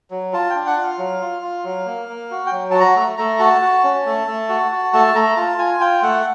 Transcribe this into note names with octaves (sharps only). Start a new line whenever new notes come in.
F#3
F4 A5
G5
D4
F#5
F4
F5
F#3
F4
F4
F#3
A#3
A#3
F#4
G5
F#3
F#4 A5
A#5
A3
A3 A#5
F#4 A5
F#4
C#4
A3
A3
F#4
F#4
A3 A5
A3 A#5
F4 A5
F4 G#5
F4 G5
A3 F#5